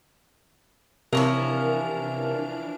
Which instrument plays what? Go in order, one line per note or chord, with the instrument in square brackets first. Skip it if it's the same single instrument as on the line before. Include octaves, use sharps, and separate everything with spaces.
[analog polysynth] C3 [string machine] E3 D4 [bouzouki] F3 C#4 E4 [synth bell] A#4